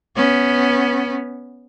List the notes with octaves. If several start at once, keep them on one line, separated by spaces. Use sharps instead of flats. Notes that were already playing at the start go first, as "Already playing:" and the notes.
B3 C#4